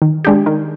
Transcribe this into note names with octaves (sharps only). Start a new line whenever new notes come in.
D#3
G#3 D4 G4
D#3